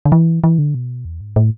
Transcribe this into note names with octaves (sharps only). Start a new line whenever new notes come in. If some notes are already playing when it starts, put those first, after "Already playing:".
D3
E3
E3
D3
B2
E2
G#2
A2